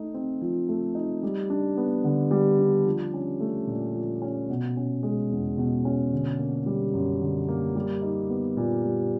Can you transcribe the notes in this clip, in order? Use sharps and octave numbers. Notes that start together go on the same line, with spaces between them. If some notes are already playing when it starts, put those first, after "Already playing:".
Already playing: A3 D#4
C4
F3
A3
D#4
G3
D4
B3
D3
G3
D4
F3
C#4
A3
A#2
F3
C#4
B2
C#4
G#3
E2
B2
C#4
D3
A#3
G3
F#2
D3
A#3
G3
D#4
B3
A#2
G3